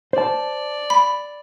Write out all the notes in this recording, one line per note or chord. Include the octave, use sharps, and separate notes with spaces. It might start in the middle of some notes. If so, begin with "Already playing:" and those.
C5 D5 A5
B5